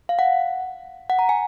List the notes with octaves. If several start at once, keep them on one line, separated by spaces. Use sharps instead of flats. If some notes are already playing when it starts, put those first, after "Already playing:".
F5
F#5
F#5
A#5
G#5